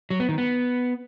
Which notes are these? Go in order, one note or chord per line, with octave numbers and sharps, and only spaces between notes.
F#3
B3
D#3
B3